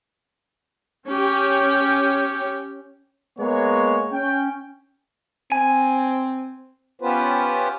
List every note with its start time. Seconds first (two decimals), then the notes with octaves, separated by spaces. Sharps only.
1.08 C#4 G4
3.39 G#3 A#3 B3 C#5
4.12 C#4 G5
5.52 C4 G#5
7.01 B3 C#4 F4 G4 B4 C5